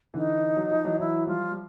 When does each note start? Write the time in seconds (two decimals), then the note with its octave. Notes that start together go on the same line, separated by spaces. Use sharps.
0.14 D3 E3 D#4
0.57 F#3
0.71 F3
0.84 E3 F#3
0.99 E3 F#3 E4
1.27 F3 G3 F4
1.51 G3